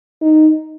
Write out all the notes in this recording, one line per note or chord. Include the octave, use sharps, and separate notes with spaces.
D#4